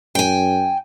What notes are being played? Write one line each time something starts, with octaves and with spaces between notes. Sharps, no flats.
F#2 G5 G#5